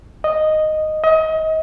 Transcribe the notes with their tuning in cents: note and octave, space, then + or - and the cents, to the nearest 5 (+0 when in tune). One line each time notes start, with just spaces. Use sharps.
D#5 -5
D#5 +30